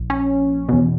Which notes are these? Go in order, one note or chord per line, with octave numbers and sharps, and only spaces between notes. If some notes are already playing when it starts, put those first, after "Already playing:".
Already playing: A#1
C#4
E2 B2